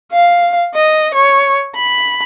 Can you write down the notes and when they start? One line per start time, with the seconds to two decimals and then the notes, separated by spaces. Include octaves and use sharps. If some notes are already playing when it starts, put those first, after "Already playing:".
0.12 F5
0.75 D#5
1.14 C#5
1.76 B5